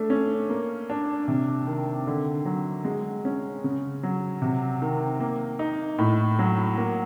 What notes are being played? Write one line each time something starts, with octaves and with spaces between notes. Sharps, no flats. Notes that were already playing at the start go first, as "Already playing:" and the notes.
Already playing: A3 D4
C#4
A#3
D4
C3
D#3
D3
F#3
G#3
C#4
C#3
F#3
C3
D#3
A#3
D#4
A2
F#3
A#3